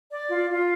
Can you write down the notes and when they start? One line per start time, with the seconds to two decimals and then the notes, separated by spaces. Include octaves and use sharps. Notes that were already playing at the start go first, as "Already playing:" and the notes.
0.11 D5
0.30 F4
0.49 F4